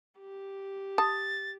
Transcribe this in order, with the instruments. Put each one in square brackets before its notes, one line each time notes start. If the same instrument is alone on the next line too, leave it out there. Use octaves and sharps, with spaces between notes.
[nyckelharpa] G4
[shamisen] A5 [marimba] D#6 [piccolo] A6